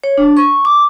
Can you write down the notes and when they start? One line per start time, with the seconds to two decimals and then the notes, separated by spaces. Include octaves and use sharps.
0.04 C#5
0.18 D4
0.37 C#6
0.65 D6